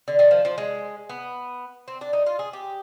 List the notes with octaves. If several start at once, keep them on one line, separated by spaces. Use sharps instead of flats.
D3
D#3
F3
F3
G#3
B3
C4
D4
D#4
F4
G#4
G4